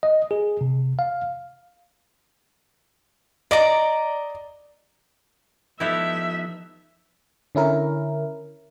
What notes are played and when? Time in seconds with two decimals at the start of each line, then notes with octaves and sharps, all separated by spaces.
0.03 D#5
0.31 G#4
0.61 C3
0.99 F5
3.51 D5 D#5 A#5
5.80 F3 B3 D#4 E4 G4 A4 E5
7.55 D3 C#4 E4 A#4